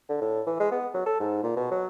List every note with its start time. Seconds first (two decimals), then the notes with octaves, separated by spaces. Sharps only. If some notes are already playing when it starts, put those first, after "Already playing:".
0.09 D3
0.21 A2
0.46 E3
0.60 G#3
0.71 B3
0.94 F#3
1.06 A4
1.20 G#2
1.43 A#2
1.56 B2
1.71 F#3